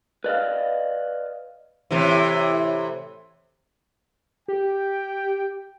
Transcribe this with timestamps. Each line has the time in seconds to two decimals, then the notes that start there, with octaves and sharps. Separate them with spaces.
0.24 B4 D5 D#5 F5
1.91 A2 C3 E3
4.48 G4 G5